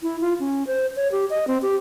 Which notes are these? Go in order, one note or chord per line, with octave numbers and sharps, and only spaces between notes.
E4
F4
C#4
C5
C#5
G4
D#5
C4
G4